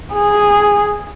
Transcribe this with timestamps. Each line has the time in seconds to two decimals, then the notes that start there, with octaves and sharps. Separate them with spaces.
0.14 G#4